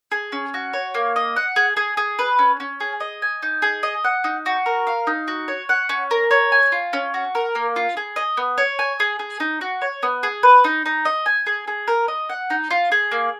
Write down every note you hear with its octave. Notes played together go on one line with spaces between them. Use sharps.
G#4
C#4
F#4
C#5
A#3
D#5
F#5
G#4
G#4
G#4
B4
C#4
C#4
G#4
D#5
G#5
D#4
G#4
D#5
F#5
D#4
F#4
A#4
F5
D#4
F#4
C#5
F#5
C#4
A#4
C#5
G#5
F4
C#4
F#4
A#4
A#3
F4
G#4
D#5
B3
C#5
G#5
G#4
G#4
D#4
F#4
C#5
B3
G#4
B4
D#4
D#4
D#5
G#5
G#4
G#4
A#4
D#5
F#5
D#4
F4
G#4
A#3